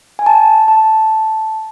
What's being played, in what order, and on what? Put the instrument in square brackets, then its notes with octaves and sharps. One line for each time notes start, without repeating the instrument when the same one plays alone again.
[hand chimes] G#5
A5
A5